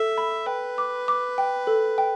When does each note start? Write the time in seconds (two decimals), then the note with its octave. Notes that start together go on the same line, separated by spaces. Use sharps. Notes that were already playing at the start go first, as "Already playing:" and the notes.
Already playing: A4 E5
0.18 B5
0.47 B4 G5
0.78 D6
1.08 D6
1.38 G5
1.67 A4
1.98 G5